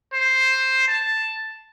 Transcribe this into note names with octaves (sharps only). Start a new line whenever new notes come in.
C5
A5